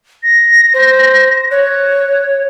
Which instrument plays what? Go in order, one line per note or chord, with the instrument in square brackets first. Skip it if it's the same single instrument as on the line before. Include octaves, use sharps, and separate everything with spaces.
[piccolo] A#6
[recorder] C5
[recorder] C#5 [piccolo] F#6